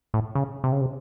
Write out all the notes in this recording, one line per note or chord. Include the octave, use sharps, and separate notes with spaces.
A2
C#3
C3
C#3
C3